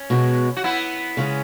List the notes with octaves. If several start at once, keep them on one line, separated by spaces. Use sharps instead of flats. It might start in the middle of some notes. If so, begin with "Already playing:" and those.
Already playing: C#4
B2 G#3 B3 F#4
F#4
B3 E4
C#3 G#3 C#4